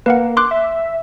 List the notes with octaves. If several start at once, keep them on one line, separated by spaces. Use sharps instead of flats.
A#3 B4 F5 F#5
C6 D6 F#6
E5